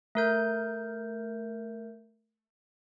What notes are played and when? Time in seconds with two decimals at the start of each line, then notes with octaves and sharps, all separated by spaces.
0.15 A3 A#4 G6